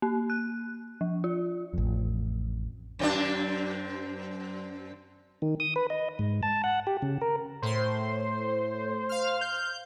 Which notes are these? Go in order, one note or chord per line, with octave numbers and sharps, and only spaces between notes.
A#3
F#6
F3
F4
A1 F2
F#2 C4 D4
D#3
D#6
B4
D#5
G#2
A5
F#5
G4
C#3
A#4
A2 C5 C6
F5 F6
G6